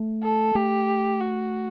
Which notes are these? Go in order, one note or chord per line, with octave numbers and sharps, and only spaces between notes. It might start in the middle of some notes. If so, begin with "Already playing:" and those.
Already playing: A3
A4
A3 G4
F#4